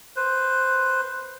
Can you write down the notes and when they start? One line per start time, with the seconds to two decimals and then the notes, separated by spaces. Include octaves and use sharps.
0.16 B4 C5